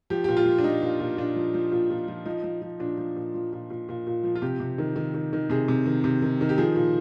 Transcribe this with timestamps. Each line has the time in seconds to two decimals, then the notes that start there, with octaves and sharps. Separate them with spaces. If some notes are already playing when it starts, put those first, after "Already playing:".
0.10 F3 G4
0.24 A#2 G4
0.37 F4
0.46 F3
0.58 D4
0.64 F3 D#4
0.82 A#2
1.00 A#2
1.17 A#2 D4
1.36 F3
1.54 F3
1.72 A#2
1.90 A#2
2.08 F3
2.25 F3 D#4
2.44 F3
2.62 F3
2.79 A#2 D4
2.98 F3
3.16 A#2
3.34 F3
3.53 A#2
3.70 A#2
3.89 A#2
4.07 A#2
4.24 F3
4.35 F4
4.42 C3 G4
4.60 C3
4.78 D#3
4.96 D#3
5.14 D#3
5.33 D#3
5.50 C3 G#4
5.68 C3
5.86 D#3
6.04 C3
6.22 D#3
6.41 D#3
6.49 G4
6.58 F3 G#4
6.76 A#2